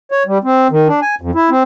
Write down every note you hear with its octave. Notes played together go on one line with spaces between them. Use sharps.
C#5
G3
C4
D#3
D4
G#5
F2
E4
C4